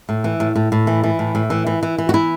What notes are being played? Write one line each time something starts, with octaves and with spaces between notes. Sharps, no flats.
A2
E3
A2
A2
A2
E3
E3
A2
A2
E3
E3
E3
E3
F#4
E3 E4